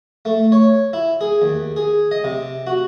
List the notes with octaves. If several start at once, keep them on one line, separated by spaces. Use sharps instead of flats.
A3
C#5
E4
G#4
D#2
G#4
D#5
C3
F#4